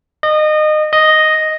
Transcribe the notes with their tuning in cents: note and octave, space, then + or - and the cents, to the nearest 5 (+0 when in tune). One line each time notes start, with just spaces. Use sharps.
D#5 -25
D#5 +0